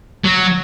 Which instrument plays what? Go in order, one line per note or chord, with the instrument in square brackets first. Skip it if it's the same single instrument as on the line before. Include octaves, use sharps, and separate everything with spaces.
[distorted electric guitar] F#3